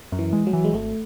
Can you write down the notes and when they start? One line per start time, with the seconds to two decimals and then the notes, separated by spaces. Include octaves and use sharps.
0.12 F#2
0.19 E3
0.33 G#3
0.47 F#3
0.53 E3
0.64 G#3
0.73 G#1 A3